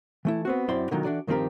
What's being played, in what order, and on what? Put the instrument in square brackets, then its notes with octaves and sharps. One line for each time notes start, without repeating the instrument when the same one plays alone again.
[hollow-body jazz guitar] E3 A3 E4
B3 C4 F#4
F#2 C4 E4 D5 C6
B2 D3 D#3 F#3 F4
E3 D4 F#4 A4 D5
G2 D#3 F3 C4 G4 A#4